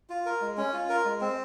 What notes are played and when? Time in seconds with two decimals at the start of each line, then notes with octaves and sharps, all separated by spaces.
0.10 F4
0.26 A#4
0.41 G#3
0.57 C#4
0.73 F4
0.89 A#4
1.05 G#3
1.21 C4